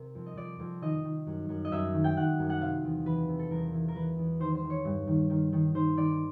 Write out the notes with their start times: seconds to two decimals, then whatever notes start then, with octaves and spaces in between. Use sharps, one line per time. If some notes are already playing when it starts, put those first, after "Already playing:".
Already playing: C3 A#4
0.15 F2
0.26 D#5
0.37 F2 D5
0.60 F2
0.81 D#3 D#5
1.04 D#3
1.27 F#2
1.49 F#2
1.65 D#5
1.72 F#2 E5
1.94 D#3
2.04 G5
2.16 D#3 F#5
2.39 F#2
2.50 F#5
2.61 C3 F5
2.84 E2
3.06 E3 B4
3.28 C3
3.39 A4
3.51 E2 A#4
3.73 E3
3.88 A#4
3.95 E3 B4
4.18 E2
4.40 D#3 C5
4.55 C5
4.63 D#3
4.70 C#5
4.85 G2
5.07 D#3
5.30 D#3
5.53 D#3
5.75 D#3 C5
5.97 D#3 D5